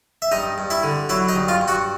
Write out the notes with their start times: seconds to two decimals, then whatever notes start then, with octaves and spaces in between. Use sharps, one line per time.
0.22 E5
0.31 G2 D#4 D#5
0.58 G2
0.70 E4 E5
0.83 D3
1.09 F#3 E4 E5
1.29 D#4 D#5
1.36 G2
1.48 F4 F5
1.61 G2
1.68 F#4 F#5